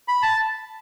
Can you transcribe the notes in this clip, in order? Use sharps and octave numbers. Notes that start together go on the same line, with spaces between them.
B5
A5